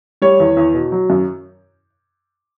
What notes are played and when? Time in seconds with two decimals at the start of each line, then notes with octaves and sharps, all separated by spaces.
0.22 G3 C#5
0.40 E2
0.57 E2
0.74 B2
0.92 F#3
1.10 F#2